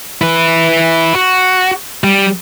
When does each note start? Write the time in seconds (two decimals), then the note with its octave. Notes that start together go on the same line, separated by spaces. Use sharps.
0.21 E4 B4
1.14 F#4
2.04 G3